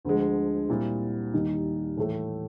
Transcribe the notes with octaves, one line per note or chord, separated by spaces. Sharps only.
D2 D3 F3 G#3
A#2 G3 C4 E4
D#2 D#3 G3 A#3 D#4
A2 E3 A3